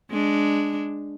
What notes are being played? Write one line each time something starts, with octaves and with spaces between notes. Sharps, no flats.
G#3 D4